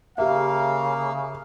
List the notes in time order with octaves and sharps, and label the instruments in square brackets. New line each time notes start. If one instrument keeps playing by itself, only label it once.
[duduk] C#3 [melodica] A#3 [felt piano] G4 E5 [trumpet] F5